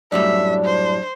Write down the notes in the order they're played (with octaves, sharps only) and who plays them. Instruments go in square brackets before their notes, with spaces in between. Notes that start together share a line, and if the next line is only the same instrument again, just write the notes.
[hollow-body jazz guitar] F#2 A2 G3 [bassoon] D4 [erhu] E5
[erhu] C5